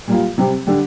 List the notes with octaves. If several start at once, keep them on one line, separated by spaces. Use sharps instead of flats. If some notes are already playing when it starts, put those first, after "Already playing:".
A#2 G3 A#3 F4
C3 G3 C4 G4
D3 G3 D4 G4